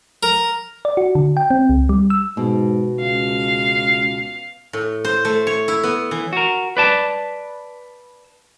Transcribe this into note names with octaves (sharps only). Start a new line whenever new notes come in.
A#4
D5
F#4
D3
G5
C4
C#2
G3
E6
G#2 B2
C#2 F5
A2
C5
A3
C#5
E4
B3
E3
F#4 A#4
B4 D5 A5